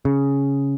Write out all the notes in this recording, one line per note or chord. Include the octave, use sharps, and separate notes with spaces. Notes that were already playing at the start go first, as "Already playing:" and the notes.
C#3